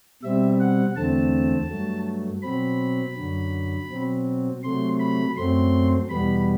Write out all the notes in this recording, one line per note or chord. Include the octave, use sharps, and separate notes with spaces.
B2 G3 C4 E5
F#5
E2 D3 A3 C4 A5
G2 F#3 A3
B2 F#3 C4 B5
F#2 D3 F#3
B2 F#3 C4
C3 F#3 A3 C6
B5
F#2 F#3 A3 C4 C6
E2 B2 G3 B3 B5